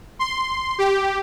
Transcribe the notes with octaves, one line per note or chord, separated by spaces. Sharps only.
C6
G4